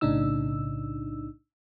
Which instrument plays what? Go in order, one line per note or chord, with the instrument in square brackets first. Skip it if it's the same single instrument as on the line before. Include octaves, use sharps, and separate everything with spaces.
[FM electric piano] B1 A2 C#3 D4 D#4 E6